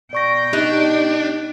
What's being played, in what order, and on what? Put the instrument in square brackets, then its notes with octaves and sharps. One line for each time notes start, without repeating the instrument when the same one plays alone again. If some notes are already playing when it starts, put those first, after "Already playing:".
[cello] B2 G5 [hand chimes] D5 C#6 A#6
[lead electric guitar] D4 [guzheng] D#4 [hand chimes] G4 F#6